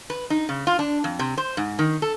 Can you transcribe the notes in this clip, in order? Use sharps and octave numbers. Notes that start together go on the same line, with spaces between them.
B4
D#4
C#3
F4
D4
F2
C3
C5
G#2
D#3
A4